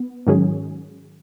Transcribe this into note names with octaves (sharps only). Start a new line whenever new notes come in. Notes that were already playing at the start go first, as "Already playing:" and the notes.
Already playing: B3
G#2 D#3 F#3 C#4 G#4